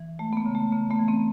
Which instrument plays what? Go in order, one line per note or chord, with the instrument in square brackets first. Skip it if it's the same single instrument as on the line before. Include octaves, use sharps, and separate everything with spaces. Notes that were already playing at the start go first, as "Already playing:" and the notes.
Already playing: [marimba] E3
G#3 A3
B3
A#3
C#3
A3
C#3 A#3
A3 B3
E3
A#3 C4